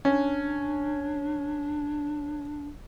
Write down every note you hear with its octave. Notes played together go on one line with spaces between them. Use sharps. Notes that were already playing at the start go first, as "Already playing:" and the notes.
C#4 D4